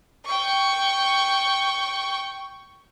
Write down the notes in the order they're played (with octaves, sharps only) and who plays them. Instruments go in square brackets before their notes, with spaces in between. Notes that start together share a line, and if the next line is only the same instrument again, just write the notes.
[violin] G5 C#6